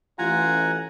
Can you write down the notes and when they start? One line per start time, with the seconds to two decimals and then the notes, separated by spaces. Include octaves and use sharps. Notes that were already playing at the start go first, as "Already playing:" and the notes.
0.18 A1 F4 F#5 G#5 A#5